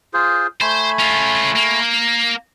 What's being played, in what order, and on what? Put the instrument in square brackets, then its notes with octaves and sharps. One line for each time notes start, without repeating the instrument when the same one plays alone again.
[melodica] F4 G#4 C5
[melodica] A3 G#5 B5 [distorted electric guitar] C5
[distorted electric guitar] C#4 F4
A#3